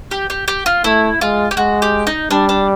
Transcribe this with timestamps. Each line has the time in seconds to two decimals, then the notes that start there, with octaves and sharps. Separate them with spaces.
0.11 G4
0.30 G4
0.48 G4
0.66 F4
0.84 A3 E4
1.21 G#3 F4
1.51 G4
1.57 G#3 F#4
1.82 G4
2.07 D#4
2.31 G3 D4
2.49 D4